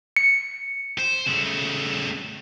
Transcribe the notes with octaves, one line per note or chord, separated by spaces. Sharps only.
C#7
C5
C#3 A3